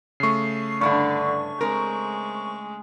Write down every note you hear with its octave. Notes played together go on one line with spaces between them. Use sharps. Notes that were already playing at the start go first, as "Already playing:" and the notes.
C#3 A3 C#6 C7
G2 D3 D4 E4 C#6
G#3 C4 A#4